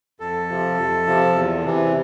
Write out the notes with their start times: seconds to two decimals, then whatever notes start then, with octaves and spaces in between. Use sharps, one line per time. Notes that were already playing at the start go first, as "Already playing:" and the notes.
0.20 F2 A4
0.49 C3 F3
0.77 F2
1.07 C3 F3
1.35 E2
1.64 C3 E3